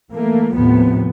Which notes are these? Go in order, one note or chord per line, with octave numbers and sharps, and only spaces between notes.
E3 A3 A#3
D#2 A2 C3 F3 B3